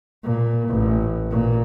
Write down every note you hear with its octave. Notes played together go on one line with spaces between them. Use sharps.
A#2
A1
A#2